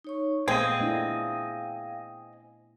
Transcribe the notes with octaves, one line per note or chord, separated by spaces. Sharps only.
D#4 C#5 C#6
A#2 A3 B3 C4 G#4 D#5 F5 G5
A3 D4 E4